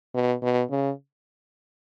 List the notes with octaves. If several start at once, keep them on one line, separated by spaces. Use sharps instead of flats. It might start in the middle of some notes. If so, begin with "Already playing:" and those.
B2
B2
C#3